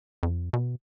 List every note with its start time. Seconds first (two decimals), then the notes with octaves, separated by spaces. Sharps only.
0.23 F2
0.53 B2